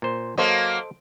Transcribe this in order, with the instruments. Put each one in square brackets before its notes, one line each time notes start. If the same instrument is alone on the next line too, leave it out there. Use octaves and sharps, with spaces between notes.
[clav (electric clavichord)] A#2 C5
[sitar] F#3 A#3 [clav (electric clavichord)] A4 C5 D#5